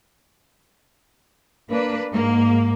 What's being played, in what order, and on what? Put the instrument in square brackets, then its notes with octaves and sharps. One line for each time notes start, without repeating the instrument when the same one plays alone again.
[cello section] A#3 D4 B4
G#2 A#3